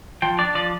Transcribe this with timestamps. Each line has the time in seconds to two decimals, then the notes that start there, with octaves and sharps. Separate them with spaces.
0.22 F3 G5
0.38 D4 D5
0.55 F3 D5